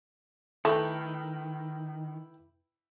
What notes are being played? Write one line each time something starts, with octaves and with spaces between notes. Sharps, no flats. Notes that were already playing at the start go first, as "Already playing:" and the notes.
D#3 A3 E4 G4 B4